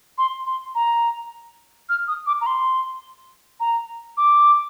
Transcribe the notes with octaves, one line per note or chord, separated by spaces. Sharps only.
C6
C6
A#5
F6
D#6
D6
A#5
C6
A#5
D6